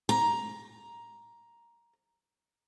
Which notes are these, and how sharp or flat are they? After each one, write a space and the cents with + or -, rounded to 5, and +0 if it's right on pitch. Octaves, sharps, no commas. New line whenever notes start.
A#5 +10